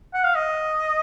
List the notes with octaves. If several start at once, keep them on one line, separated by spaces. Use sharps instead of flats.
F#5
F5
D#5